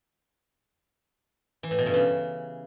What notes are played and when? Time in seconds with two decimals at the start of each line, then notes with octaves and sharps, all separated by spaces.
1.63 E3
1.71 A2
1.79 B2
1.86 G2
1.94 C#3